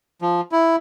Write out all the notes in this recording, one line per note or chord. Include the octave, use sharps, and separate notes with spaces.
F3
E4